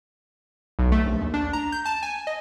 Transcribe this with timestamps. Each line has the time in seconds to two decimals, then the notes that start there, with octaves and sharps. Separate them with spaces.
0.79 B1
0.92 A3
1.06 A#1
1.21 D#2
1.34 D4
1.53 A#5
1.72 G6
1.85 A5
2.03 G#5
2.27 D#5